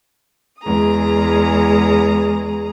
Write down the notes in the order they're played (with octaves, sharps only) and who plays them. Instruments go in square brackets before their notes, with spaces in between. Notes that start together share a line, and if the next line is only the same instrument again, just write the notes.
[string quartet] E2 G#3 G#4 A#5 D#6